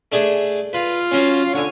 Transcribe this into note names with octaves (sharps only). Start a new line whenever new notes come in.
A3 D4 G#4
F4 B4
F#3 C#4
D3 C#5 G#5